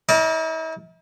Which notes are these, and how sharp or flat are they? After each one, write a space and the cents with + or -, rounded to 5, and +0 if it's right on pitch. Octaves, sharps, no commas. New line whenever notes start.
E4 -45 A#4 +0 D5 +0